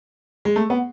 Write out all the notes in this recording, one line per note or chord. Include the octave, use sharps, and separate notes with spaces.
G#3
A3
B3